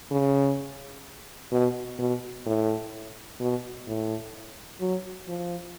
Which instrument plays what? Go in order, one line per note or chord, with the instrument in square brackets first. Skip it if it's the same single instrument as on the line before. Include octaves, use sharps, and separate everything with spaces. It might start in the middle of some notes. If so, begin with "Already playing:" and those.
[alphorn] C#3
B2
B2
A2
B2
A2
F#3
F3